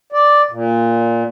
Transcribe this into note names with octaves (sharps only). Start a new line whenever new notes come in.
D5
A#2